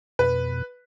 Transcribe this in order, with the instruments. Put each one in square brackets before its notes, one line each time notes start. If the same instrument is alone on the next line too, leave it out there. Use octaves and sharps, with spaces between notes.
[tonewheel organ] F2 B2 [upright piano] B4